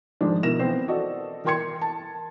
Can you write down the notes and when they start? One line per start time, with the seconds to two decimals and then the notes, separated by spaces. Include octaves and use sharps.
0.21 G#2 D#3 F3 G#3 D4
0.43 B2 E4 A#4 A#6 E7
0.59 E3 B3 C4 C5
0.88 F#4 A4 D5 D#5
1.44 E3 A#4 G5 C6 G#6 C#7
1.81 A5